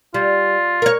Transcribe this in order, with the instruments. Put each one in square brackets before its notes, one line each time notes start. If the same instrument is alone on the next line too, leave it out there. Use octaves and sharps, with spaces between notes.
[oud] G3 [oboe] F4
[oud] A#4 C#5